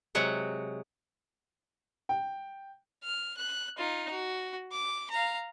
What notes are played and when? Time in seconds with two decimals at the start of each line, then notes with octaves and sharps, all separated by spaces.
0.15 C3 F#3 G#3 F#5
2.09 G5
3.04 F6
3.37 F#6
3.78 D#4 F4
4.11 F#4
4.72 D6
5.10 F5 A#5